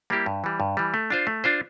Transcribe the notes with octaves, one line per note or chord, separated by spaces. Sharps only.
G3 A#3 E4 G4
G2
E3 G3
G2
E3 G3
A3
D4 F4 C5
A3
D4 F4 C5